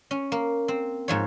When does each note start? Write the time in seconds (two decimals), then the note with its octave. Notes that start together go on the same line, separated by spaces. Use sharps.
0.11 C#4
0.32 A#3
0.68 C4
1.08 G#2 F3 C#5